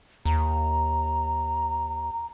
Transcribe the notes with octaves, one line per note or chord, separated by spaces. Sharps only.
D#2 A#5